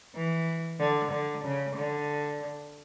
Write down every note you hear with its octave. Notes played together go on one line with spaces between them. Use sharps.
E3
D3
D3
C#3
D3